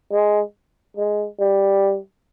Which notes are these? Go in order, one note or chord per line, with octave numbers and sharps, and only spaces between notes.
G#3
G#3
G3